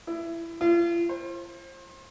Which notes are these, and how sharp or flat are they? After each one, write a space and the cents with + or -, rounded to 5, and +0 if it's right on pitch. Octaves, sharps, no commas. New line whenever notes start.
E4 +20
F4 -40
C5 +35